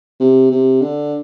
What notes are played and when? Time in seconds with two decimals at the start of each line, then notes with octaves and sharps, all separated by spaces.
0.20 C3
0.51 C3
0.82 D3